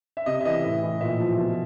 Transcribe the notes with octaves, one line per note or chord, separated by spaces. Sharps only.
E5
C3 D#5
E5
E3 D#5
A2
E3
A#2 E5
F3
B2